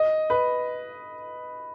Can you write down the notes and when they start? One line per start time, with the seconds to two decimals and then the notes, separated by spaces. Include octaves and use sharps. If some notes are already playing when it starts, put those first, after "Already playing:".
Already playing: D#5
0.30 B4